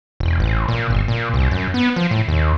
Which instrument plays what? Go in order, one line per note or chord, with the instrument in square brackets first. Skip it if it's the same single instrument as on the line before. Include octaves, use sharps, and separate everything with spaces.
[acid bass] E1
A1
A#2
G1
A#2
C2
F#2
B3
F3
A2
D#2